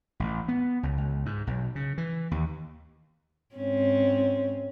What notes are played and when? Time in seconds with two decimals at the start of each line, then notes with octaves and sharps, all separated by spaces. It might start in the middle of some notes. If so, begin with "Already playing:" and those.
0.20 A1
0.48 B3
0.83 C#2
0.98 C#2
1.26 G#2
1.47 B1
1.75 C#3
1.98 E3
2.31 D#2
3.55 G#2 C4 C#4